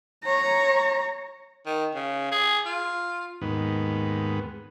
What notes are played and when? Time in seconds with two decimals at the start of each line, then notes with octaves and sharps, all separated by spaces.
0.24 C#5 A#5
1.66 D#3
1.95 C#3
2.32 G#4
2.66 F4
3.41 D#2 G#2 B3